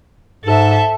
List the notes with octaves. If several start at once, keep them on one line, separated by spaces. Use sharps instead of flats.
G#2 A4 E5